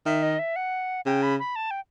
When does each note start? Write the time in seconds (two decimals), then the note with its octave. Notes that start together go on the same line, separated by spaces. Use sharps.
0.06 D#3 E5
0.23 D#5
0.39 E5
0.56 F#5
1.06 C#3 G5
1.23 B5
1.39 B5
1.56 A5
1.71 G5